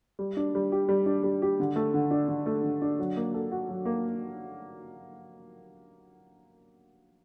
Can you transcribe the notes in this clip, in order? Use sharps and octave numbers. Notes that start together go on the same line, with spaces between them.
G3
D4
G3
G4
G3
D4
G3
G4
D3
A3
D3
D4
D3
A3
D3
D4
F#3
A#3
A4
F#4
F#3
A#3